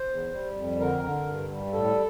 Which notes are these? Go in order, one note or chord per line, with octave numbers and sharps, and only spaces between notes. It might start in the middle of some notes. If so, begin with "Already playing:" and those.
Already playing: C5
E2
G3
F2
D3 A#4
D3
G2
G3
A2 A4